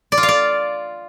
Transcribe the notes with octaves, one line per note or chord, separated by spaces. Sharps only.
D5
F4
F5
D5